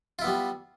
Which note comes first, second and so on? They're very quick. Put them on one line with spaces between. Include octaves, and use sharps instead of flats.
F4 E4 B3 G3